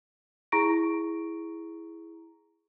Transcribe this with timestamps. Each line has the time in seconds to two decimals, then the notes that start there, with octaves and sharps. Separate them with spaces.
0.52 E4 G#4 A#5 C#6 A#6 D7